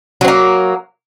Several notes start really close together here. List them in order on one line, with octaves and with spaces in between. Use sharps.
F#3 C4 A#3